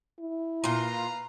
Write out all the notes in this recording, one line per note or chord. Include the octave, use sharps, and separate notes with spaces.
E4
A#2 F4 B4 F5 A#5